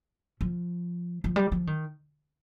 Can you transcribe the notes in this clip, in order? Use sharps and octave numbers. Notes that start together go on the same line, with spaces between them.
F3
F3
G3
F3
D#3